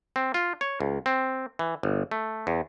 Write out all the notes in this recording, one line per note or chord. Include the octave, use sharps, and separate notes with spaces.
C4
F4
C#5
C#2
C4
E3
G1
A3
E2